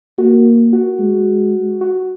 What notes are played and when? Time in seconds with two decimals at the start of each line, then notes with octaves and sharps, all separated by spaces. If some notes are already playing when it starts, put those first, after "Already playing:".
0.18 A#3 F#4
0.73 F#4
0.99 G#3
1.81 F#4